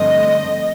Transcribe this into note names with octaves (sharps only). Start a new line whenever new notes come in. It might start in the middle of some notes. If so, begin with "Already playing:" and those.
Already playing: G2 D3 F3 A3 C4 D#5